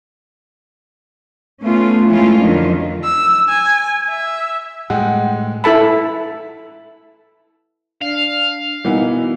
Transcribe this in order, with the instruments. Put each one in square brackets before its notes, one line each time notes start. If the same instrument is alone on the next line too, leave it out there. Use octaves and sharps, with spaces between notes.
[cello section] A3 B3 C#4 F4
E3 G#3 A3 C#4 E4 F4
F2 D3 D#3 F3 F#3
[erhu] E6
G#5
E5
[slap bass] A2 G3 [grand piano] G#3 [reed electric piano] F#5 G5
[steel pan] E4 A4 A5 B5
[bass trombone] D4 [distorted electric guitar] F5
[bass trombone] B2 [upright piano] E3 A#3 B3 [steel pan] G3 D#4